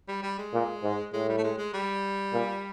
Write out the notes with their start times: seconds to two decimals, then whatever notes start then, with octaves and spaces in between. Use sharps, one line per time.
0.08 G3
0.23 G3
0.39 G#3
0.53 A#2
0.83 G#2
1.13 A2 G#3
1.29 G3
1.38 A3
1.44 G#3
1.58 G#3
1.73 G3
2.34 A#2